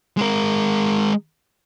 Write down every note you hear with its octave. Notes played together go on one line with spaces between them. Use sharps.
G#3 A#4